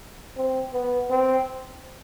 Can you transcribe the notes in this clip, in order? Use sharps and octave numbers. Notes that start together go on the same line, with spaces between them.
C4
B3
C4